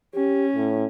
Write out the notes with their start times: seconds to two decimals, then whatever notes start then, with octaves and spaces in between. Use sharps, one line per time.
0.15 C#4 G4
0.56 A2